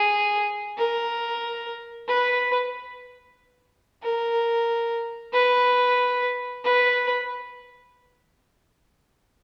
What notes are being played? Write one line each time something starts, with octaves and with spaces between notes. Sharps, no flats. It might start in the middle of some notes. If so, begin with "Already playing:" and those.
Already playing: G#4
A#4
B4
A#4
B4
B4